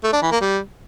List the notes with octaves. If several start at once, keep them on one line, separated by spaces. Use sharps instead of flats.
A3
D4
E3
A#3
G3